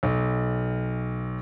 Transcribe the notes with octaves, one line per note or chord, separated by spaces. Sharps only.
B1